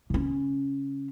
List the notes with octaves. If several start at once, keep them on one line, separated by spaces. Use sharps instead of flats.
C#3 C#4